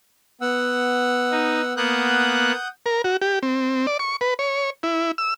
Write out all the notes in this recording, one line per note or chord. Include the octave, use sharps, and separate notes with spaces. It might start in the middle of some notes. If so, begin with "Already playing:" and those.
B3 F#5 E6
D#4
A#3 B3 F#5 D#6 F#6 G6
A#4
F#4
G4
C4
D5
C#6
B4
C#5
E4
E6